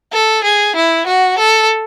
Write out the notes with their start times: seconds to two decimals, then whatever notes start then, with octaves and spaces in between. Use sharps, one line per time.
0.12 A4
0.44 G#4
0.76 E4
1.07 F#4
1.38 A4